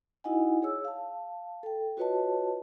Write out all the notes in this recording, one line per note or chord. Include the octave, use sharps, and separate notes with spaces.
D#4 E4 F#4 D#5 F#5 G#5
G#4 C#5 E6
F5 A5
A4 G5
F4 F#4 B4 C#5 D#5 A5